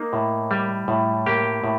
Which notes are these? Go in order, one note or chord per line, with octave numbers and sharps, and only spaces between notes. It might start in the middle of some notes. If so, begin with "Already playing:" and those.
Already playing: A#3 D#4
A2
G3
A2
A#3 G4
A2